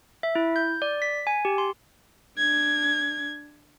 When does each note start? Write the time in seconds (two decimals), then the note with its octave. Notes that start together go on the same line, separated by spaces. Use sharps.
0.23 E5
0.35 E4
0.56 G6
0.82 D5
1.02 B6
1.27 G#5
1.45 G4
1.58 C6
2.38 D4 G#6